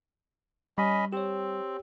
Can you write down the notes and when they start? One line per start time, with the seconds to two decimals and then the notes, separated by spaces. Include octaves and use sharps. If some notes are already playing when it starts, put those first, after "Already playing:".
0.78 G3 C#4 D#5 B5
1.12 C4 G4 C#5